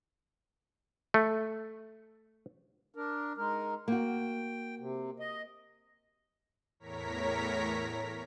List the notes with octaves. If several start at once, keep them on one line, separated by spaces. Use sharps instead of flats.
A3
D4 A#4
G#3 D#4 A#4
A#3 F#4 G5
C3
D#5
E2 A2 A#4 C#5 A#5 B6